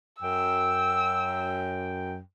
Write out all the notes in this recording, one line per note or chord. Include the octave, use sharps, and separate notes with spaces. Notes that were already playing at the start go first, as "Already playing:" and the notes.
F#2 G5 E6